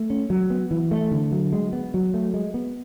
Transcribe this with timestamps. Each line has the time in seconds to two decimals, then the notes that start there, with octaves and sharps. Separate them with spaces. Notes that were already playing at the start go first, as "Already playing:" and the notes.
Already playing: A3
0.10 C#4
0.30 F#3
0.50 B3
0.71 E3
0.91 A3
1.12 D3
1.32 F#3
1.53 G#3
1.73 B3
1.94 F#3
2.14 A3
2.34 G#3
2.54 B3